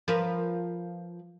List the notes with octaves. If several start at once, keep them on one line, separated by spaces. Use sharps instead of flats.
F3 A#4 B4